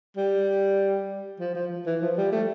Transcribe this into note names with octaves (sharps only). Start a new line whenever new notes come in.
G3
F3
F3
E3
F3
G3
A3